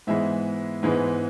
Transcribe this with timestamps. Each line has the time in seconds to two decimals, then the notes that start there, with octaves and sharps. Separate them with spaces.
0.07 G#2 E3 G#3 B3 E5
0.83 G#2 E3 G#3 B3